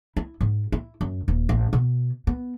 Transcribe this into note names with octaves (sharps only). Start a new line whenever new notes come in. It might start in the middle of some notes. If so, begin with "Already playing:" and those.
E4
G#2
E4
F#2
D#1
A1
B2
B3